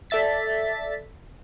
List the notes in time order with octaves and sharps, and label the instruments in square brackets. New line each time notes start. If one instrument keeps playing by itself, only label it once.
[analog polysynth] A4 D5 E5 A6 B6